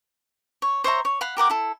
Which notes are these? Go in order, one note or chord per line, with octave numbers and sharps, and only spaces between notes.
C#5
C5 C#5 E5 A#5
C#5
F5 F#5 B5
G4 A#4 F#5 D6
E4 A4